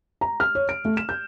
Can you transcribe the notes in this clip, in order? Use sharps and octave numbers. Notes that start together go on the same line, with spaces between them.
A#5
F6
C#5
D7
A3
E7
G6